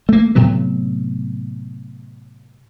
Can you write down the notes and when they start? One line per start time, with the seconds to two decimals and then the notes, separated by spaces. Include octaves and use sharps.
0.09 A3 A#3
0.35 A2 C3 F#3 B3